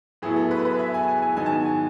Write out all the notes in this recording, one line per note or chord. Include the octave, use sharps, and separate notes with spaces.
A2 F#3 B3 E4 G#4
A4
B4
B4
E5
G#5
G#5
G#5
G#2 D#3 F#3 B3 D#4 G#5
A5
G#5